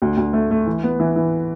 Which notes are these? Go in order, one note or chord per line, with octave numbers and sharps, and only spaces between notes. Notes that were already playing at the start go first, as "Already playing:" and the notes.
D2
D2
A3
A3
E3
B3
E3
E3